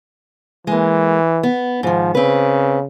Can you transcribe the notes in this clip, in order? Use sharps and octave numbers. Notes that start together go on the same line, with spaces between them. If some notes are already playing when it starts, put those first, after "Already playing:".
E3 G#3 A#3
B3
G#2 D#3 F3
C#3 C4 B4